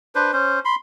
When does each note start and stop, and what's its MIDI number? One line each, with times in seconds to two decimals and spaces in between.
0.15 0.32 62
0.15 0.32 71
0.15 0.32 72
0.33 0.60 61
0.33 0.60 72
0.65 0.75 83
0.65 0.75 84